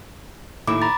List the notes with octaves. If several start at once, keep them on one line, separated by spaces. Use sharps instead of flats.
D#2 A2 E4 D6
A#5 B5 A6